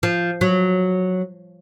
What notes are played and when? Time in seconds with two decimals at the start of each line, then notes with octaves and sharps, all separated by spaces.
0.03 F3
0.41 F#3